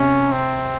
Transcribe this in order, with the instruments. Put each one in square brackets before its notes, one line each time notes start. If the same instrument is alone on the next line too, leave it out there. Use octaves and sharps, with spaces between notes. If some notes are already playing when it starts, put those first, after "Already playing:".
Already playing: [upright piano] C3 [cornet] C#4
[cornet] C4